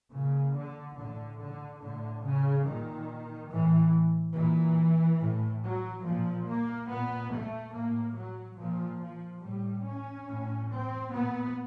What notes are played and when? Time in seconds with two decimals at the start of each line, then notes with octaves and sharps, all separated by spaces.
0.12 A#2 C#3
0.55 D3
0.97 A2 D3
1.39 D3
1.81 A2 D3
2.24 C#3
2.66 A#2 D#3
3.51 A2 E3
4.35 A#2 E3
5.20 A2
5.63 F#3
6.05 A#2 F3
6.47 A#3
6.89 A#2 B3
7.32 A3
7.74 A2 A#3
8.16 F#3
8.58 A#2 F3
9.01 F3
9.43 A2 G3
9.85 C#4
10.28 A2
10.70 C4
11.12 A#2 B3